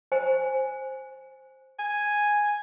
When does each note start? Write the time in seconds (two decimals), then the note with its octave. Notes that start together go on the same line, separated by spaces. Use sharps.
0.12 C5 G#5
1.79 G#5